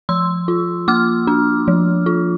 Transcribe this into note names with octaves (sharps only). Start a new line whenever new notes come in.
F3 C6 E6
F4
A#3 D6 F6
D4
F3
F4